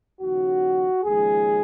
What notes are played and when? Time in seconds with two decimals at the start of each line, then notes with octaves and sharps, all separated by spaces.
0.21 D#2 C#3 F3 F#4
1.03 D#2 C#3 F3 G#3 G#4